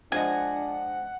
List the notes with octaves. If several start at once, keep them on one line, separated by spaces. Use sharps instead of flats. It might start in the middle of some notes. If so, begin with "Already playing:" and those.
F3 G#3 D4 F#5 G#5 A#5